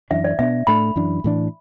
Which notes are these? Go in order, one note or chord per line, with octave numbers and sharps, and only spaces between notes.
F#2 E3 D4 E5
D5
B2 B3 D4 E5
A2 A3 D4 B5
F#2 E3 D4
A2 E3 D4